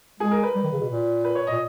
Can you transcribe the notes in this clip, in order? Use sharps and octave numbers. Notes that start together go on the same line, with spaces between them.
G#3 G#4
A#4
B4
G3
D#3
C#3
B2
A#2
B4
C#5
A#2 D#5